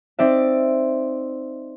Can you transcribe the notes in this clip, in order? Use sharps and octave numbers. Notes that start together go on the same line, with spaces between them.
C4 D#4 D5 E5